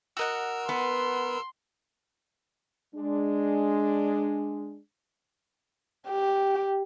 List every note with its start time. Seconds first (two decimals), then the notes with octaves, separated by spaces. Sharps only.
0.17 F#4 A#4 D#5 F#5 E6
0.69 B3 C6
2.95 G#3 D4
6.09 G4